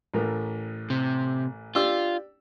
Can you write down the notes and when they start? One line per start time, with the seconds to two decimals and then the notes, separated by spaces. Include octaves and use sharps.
0.14 A1 A2 A#4
0.90 C3
1.75 D4 F4 G4 E6